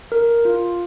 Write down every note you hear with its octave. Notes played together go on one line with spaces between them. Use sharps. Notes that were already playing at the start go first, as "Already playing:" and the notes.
A#4
F4